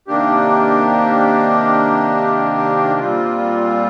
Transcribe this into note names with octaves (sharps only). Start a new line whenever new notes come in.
C3 D#3 A#3 D4 G4
A#2 G3 C4 F4